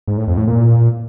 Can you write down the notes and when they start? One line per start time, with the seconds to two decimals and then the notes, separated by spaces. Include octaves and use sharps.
0.08 G#2
0.17 A2
0.27 F2
0.37 A2
0.47 A#2